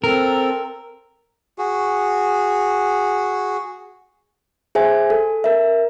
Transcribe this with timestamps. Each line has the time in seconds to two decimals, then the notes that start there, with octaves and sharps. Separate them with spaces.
0.04 C4 A4 A#4
1.58 F#4 G#4
4.75 G#4 C5 E5 G#5
5.10 A4
5.44 A#4 E5